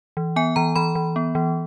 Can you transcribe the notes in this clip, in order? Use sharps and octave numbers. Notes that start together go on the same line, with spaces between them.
E3
B3 G#5
E3 A#5
E3 B5
E3
B3
E3